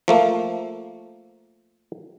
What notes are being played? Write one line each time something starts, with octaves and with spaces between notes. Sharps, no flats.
F3 A3 A#3